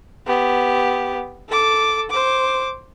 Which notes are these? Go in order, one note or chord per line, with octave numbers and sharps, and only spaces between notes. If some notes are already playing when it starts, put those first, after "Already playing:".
B3 G4
A4 D6
C5 D6